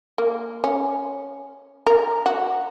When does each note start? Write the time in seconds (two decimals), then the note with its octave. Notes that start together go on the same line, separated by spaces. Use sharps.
0.18 A#3
0.64 C#4
1.87 A#4
2.26 F#4